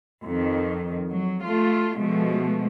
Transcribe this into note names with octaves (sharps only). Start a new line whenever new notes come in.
F2 D#3
F#3
A3 F4
B2 F3 G#3 A3